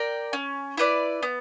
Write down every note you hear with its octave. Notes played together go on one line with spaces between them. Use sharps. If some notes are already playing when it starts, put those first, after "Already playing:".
Already playing: A#4 D5 G5
C#4
E4 B4 D5
B3